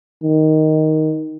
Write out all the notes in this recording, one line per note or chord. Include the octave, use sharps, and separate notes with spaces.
D#3